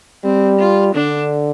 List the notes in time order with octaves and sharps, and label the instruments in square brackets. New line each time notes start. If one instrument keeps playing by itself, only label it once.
[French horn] G3 [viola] C4
[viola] F4
[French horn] D3 [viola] D4